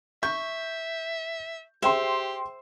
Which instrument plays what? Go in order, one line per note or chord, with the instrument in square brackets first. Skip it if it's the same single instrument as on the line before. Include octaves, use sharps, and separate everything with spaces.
[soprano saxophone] E5 [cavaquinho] C#6 [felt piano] G6
[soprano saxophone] G4 [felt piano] G#4 G5 C6 [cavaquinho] C5 E5